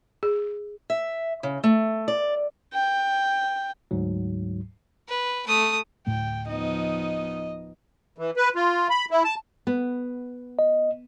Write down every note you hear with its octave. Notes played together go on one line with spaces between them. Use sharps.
G#4
E5
C#3
A3
D5
G5
D2 G#2 F#3
B4
A3 D#6
D1 A2 A3 G5
F3 B3 D#4 D#5
E3
B4
F4
B5
E4
A5
B3
D#5